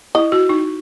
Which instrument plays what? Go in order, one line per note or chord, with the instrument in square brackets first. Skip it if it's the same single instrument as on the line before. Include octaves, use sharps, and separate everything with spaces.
[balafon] E4 [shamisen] D#5
[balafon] F#4
D#4